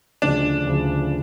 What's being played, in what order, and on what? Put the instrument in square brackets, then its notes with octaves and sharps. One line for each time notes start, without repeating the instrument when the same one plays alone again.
[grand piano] D2 C#3 F3 [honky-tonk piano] D4
[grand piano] D2 C#3 F3